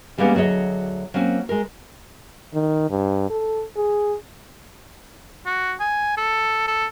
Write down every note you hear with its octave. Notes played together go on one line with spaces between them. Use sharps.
E3 G3 G#3 A#3 B3 C#4
D2 F#3 G#4 C#5 D#5
F#3 A#3 C4 C#4
G#3 A#4
D#3
G2
A4
G#4
F#4
G#5
A4
A4